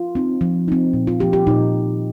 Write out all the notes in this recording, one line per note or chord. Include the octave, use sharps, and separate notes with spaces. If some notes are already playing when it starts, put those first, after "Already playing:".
Already playing: F4
C4 D#4
F3
C4 D#4
A#2
F4
F3 A#3 G4
G4
A#2 D#4